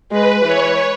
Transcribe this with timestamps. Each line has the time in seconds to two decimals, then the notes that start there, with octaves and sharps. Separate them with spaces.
0.12 G#3 B4
0.46 E3 C#5